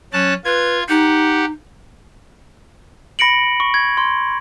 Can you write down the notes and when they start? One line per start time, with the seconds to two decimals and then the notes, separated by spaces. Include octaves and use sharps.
0.13 F#3 C#4 A5 F#6
0.44 F4 B4 G#6
0.89 D#4 G4 F#5
3.19 B5 A#6 C#7 D7 F#7
3.60 C#6
3.74 G#6
3.97 C6